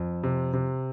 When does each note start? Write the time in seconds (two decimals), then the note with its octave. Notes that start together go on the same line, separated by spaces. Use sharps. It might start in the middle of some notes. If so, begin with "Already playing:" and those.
Already playing: F2
0.23 C3
0.53 C3